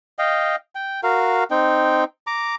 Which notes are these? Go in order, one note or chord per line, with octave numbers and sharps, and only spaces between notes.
D#5 F5 G5
G5
F#4 A#4 F5
C4 D#4 G5
A#5 D6